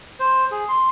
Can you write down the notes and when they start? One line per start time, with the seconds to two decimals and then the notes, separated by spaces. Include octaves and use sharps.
0.20 C5
0.51 G#4
0.69 C6